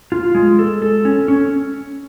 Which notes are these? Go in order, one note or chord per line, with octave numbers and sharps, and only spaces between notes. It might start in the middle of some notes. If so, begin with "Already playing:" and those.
F4
G#3
A4
A4
C#4
C#4